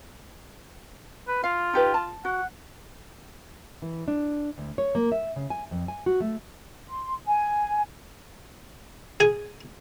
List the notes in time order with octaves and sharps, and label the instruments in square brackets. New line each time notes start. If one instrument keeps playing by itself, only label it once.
[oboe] B4
[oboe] F4 [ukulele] F5
[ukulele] D#4 G4 B4
A5
[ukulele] F#4 [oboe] F#5
[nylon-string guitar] E3
D4
D2
C#5
A#3
E5
C#3
G#5
F2
G#5
F#4
A3
[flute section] C6
G#5
[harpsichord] G#4 G#5